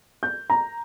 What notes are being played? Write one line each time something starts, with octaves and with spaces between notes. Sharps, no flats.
G6
A#5